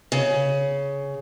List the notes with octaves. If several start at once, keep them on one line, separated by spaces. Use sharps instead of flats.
C#3